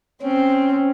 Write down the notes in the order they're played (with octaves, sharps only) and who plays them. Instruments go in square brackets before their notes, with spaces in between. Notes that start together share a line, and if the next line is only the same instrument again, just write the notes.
[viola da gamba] C4 [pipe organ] C#4